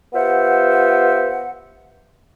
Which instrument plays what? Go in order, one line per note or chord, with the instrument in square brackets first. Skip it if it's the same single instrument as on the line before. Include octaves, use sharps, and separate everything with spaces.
[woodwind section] B3 F4 G4 C5 E5 F#5